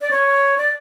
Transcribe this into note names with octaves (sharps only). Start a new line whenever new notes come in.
D5
C#5
D5